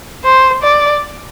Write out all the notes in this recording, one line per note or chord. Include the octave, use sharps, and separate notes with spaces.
C5
D5